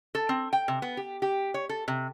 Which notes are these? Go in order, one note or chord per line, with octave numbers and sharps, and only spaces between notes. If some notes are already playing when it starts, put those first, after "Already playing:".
A4
C4
G5
C3
B3
G4
G4
C#5
A4
C3